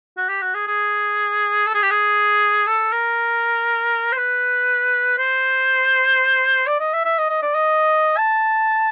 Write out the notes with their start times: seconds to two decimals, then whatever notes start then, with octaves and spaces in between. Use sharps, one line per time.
0.17 F#4
0.29 G4
0.42 F#4
0.54 G#4
0.67 G#4
1.67 A4
1.74 G#4
1.82 G4
1.90 G#4
2.67 A4
2.92 A#4
4.12 C5
4.17 B4
5.18 C5
6.67 D5
6.80 D#5
6.93 E5
7.05 E5
7.18 D#5
7.30 D#5
7.42 D5
7.55 D#5
8.17 A5